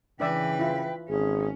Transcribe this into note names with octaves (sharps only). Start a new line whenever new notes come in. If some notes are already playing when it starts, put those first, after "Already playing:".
C#3 E3 D4 B4 D5 E5 G5
E4 F4
G#1 C#4 G#4